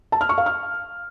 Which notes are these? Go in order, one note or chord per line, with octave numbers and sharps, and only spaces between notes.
A5
F6
C#6
F5
F6